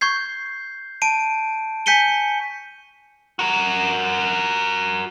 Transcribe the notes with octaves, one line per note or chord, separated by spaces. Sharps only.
C#6 G6 G#6 C7
A5 D7 D#7
G#5 G6 B6 C#7 D#7 G7
F#4 A#4